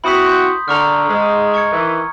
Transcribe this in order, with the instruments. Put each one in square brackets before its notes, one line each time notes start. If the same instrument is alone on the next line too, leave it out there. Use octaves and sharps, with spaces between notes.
[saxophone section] C4 E4 F#4 [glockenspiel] B5 D#6 B6
[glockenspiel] C6 G6
[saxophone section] D3 [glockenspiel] A#5 C#6 F6
[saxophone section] G#2 G#3
[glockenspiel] C#6 G#6 C#7
[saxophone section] D#3 E3